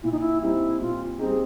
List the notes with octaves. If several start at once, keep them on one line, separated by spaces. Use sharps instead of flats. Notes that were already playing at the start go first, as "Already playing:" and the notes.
A#2 E4
D#4
E4
G3 C4 D#4 E4
A#2 F4
G3 C4 D#4 G#4